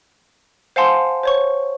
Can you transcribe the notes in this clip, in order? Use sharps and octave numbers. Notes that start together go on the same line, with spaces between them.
C5 F5 F#5 G#5 A5 C6
C5 C#5 C#6